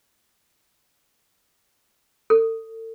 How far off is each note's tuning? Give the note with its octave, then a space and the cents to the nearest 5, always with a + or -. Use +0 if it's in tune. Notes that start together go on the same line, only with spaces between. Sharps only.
A4 +40